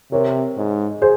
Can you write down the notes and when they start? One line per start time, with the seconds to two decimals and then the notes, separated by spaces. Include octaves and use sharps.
0.12 C3 A#4 C#5
0.57 G#2
1.02 G#4 C5